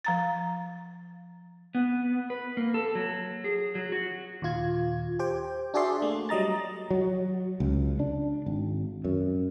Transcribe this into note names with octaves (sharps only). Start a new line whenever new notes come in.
F3 A#5 A6
B3
B4
A#3
A4
F#3
G#4
F#3
F#4
D#2 A#2 F4 G#6
G4 C5 G5
D4 F#4 G#4 D5 E5 C6
A3 A#3
F#3 G3 D#5 A#5 A6
F#3
C#2
D4
G#1
F#2